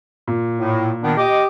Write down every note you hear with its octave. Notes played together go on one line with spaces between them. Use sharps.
A#2
A2
D#3 B3 D4
G4 D#5 D6